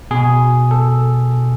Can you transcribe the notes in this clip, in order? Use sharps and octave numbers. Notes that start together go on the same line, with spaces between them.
B2 G#4
A4